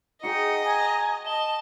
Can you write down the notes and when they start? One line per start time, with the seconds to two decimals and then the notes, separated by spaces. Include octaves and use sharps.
0.23 D#4 F#4 G#4 D#5 G5 C#7
0.65 G#5 A#5
1.26 D#5 A5 G7